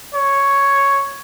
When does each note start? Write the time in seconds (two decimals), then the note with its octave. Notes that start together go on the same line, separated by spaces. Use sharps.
0.15 C#5